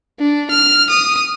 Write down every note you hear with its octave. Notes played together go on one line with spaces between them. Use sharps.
D4
F6
D#6